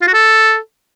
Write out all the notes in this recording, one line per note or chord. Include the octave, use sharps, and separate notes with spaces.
F4
F#4
A4